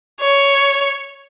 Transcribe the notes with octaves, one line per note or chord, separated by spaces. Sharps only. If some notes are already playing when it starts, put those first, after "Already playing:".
C#5